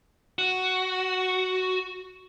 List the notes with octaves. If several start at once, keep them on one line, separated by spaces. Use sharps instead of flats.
F#4